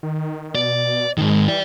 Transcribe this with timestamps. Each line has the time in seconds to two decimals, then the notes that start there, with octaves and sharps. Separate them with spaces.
0.03 D#3
0.55 B2 D5
1.18 G#2 D#3 G#3
1.48 E3 D5 G5